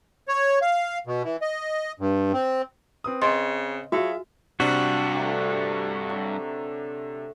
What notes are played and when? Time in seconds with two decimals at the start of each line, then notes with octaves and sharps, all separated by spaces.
0.28 C#5
0.62 F5
1.07 B2
1.24 E3
1.42 D#5
1.99 G2
2.33 C4
3.04 C4 B4 D#6
3.22 C#3 D#5 C6
3.92 F#3 F4 F#4 G#4 E5
4.60 G2 C3 D4 F#4
5.14 D3 A3 A#5
6.10 F#3